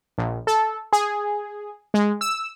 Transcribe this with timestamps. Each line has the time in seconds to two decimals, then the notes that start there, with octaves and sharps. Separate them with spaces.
0.18 A#1
0.47 A4
0.93 G#4
1.94 G#3
2.21 E6